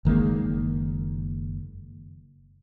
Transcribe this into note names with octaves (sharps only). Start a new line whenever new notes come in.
F#1 D#3 G#3 A#3